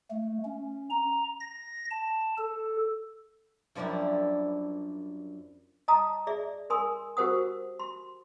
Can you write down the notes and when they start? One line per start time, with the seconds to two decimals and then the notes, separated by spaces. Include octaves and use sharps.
0.11 A3
0.45 C#4
0.90 A#5
1.40 A#6
1.91 A5
2.38 A4
3.75 F#2 F3 G3 A#3 D4 E4
5.88 D#5 A5 A#5 D#6
6.27 G#4 D5 E5
6.70 A#4 G#5 C6 D#6
7.17 F#4 G4 A#4 C5 F#5 D#6
7.80 C6